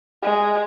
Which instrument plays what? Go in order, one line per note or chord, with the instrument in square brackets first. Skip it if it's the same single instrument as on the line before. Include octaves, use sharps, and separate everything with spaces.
[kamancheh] G#3